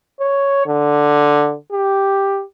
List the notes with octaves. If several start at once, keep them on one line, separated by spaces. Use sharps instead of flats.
C#5
D3
G4